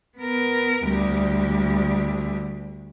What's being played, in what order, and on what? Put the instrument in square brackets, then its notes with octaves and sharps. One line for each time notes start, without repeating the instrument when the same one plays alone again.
[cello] B3 A#4
D2 G3